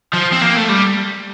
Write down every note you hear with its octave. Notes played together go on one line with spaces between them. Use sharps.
F3
C4
A#3
A3
G3